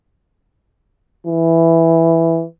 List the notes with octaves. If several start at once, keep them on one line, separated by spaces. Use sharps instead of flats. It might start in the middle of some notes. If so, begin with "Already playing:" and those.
E3